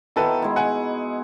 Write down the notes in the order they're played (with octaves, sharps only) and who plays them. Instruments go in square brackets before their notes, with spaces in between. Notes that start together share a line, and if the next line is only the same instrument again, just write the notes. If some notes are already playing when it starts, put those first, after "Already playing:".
[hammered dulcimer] B2 D#3 [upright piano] E4 A4 B4
[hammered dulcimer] G#3 E4
[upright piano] F#5 G#5